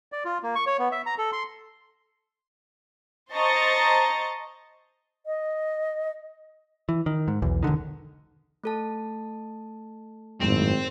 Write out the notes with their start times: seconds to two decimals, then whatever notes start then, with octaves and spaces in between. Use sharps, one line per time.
0.12 D5
0.25 F4
0.43 A#3
0.55 C#6
0.67 C#5
0.79 B3
0.92 E5
1.06 A#5
1.18 A4
1.32 C6
3.32 C5 D#5 A5 A#5 C#6 A6
5.26 D#5
6.89 E3
7.06 D#3
7.28 G#2
7.42 B1 E2
7.63 E1 C2 D3 D#3
8.64 A3 A4 A5
10.41 G#1 F#2 A2 C4